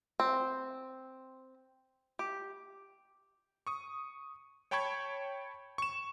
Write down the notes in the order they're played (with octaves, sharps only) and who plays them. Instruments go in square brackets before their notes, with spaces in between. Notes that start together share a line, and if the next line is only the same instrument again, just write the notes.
[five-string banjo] C4
G4
[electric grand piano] C#6 D#6
C#5 G5 A5 B5 C#6 G#6
C#6 E7